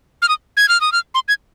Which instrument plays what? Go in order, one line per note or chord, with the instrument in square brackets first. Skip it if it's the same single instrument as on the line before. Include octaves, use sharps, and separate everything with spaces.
[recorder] F6
D#6
G#6
F6
D#6
F6
C6
G#6